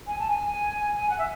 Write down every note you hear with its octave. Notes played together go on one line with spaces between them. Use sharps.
G#5
A5
G#5
G#5
F#5
E5